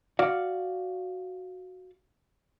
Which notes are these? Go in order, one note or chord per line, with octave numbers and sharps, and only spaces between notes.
F#4 D5 F5